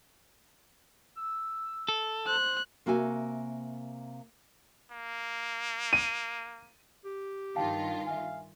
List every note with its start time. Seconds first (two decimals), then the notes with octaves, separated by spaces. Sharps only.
1.17 E6
1.88 A4
2.27 C5 F#6
2.86 C3 A#3 F#4 E5 G#5
4.92 A#3
5.93 D#7
7.04 G4
7.56 G2 D#3 F4 F5 G5 A5
8.06 E5 F5 G#5